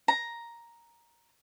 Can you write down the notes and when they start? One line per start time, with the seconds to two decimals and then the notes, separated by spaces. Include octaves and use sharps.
0.08 A#5